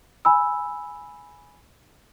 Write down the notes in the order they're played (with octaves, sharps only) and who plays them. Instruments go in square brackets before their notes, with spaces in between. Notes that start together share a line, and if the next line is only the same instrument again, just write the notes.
[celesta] G#5 B5 E6